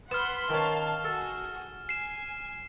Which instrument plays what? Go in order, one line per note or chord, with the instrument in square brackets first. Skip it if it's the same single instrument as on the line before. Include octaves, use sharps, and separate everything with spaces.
[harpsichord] B3 [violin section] F#5 B5 C6 [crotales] F6 E7
[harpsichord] D#3 C#4 [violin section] F5 A5
[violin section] F#4 G#4 [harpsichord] A4
[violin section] G#5 [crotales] C7 E7